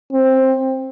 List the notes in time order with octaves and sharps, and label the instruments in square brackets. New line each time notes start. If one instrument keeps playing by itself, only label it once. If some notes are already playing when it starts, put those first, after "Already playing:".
[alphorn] C4